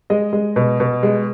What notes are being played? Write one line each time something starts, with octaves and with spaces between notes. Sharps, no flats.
G#3 D#5
G#3
B2
B2
G#3